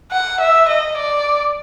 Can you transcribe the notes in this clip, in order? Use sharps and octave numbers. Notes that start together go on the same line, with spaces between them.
F#5
E5
D#5
D5